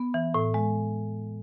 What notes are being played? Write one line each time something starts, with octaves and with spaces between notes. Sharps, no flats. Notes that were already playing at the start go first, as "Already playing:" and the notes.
Already playing: B3
E3
A2
G#3